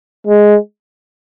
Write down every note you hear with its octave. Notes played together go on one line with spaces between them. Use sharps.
G#3